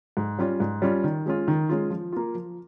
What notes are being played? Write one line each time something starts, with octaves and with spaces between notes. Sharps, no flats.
G#2
G3 C#4 F4
G#2
G3 C#4 F4
D#3
G#3 C#4 F4
D#3
G#3 C#4 F4
F3
A#3 F4
F3